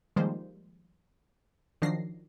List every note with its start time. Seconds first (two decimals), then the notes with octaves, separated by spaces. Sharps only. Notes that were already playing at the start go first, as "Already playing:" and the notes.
0.16 D#3 F3 G3 G#3 A#3 C5
1.82 D#3 F3 F#3 D4 A#6 C7